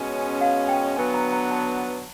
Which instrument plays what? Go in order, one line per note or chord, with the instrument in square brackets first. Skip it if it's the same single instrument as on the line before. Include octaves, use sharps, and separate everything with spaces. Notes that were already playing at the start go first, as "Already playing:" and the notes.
Already playing: [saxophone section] B2 G#3 C#4
[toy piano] F5
G5
[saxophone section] D3 F#3 B3 [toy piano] G#5
[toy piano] A#5
A#5
A5